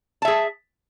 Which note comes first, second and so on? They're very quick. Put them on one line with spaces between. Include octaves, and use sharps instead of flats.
A5 E5 G#4